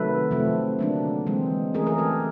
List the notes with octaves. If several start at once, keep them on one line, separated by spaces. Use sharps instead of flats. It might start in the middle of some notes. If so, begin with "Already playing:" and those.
Already playing: C3 D#3 F#3 A3 A4 B4
C3 F3 A3 C4
D3 F#3 A#3 D4
E3 G#3 C4
E3 A3 C#4 G#4 A#4
G#4 A#4
G4 A4